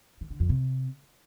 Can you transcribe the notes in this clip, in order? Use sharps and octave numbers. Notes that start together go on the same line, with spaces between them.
D#3
D3
F2
C3